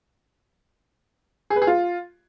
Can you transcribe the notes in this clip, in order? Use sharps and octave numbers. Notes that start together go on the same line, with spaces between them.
G#4
B4
G#4
F4